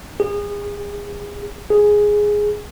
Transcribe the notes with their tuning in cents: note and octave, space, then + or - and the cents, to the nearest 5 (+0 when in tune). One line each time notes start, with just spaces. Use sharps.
G#4 -30
G#4 +0